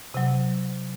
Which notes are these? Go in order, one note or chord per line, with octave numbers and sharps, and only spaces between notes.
C3 F#3